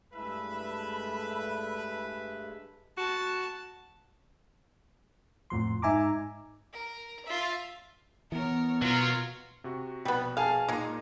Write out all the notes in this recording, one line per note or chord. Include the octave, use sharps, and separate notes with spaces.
G2 G#3 A3 E4 B4 E5 A5 B5
F#4 A5
F2 A2 F3 C6
G#2 D#4 E5 G#5 A#5 D6
A#4
F4 E5
E3 B3 A#4 C#5
B2 F#3 F4 A#4
C3 F#4 C#6
A#1 B2 G3 B3
G#4 F5 G#5 A5
A#2 G#3 A#3 D#4